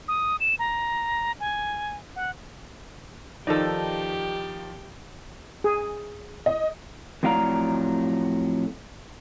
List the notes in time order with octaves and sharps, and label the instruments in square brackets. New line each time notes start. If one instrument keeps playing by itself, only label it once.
[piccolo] D#6
E7
A#5
G#5
F#5
[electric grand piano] D#3 F3 D5 [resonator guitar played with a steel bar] D#4 A4 [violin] G4
[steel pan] G#4
[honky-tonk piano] D#5
[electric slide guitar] F2 A2 F#3 D5 F5 A#5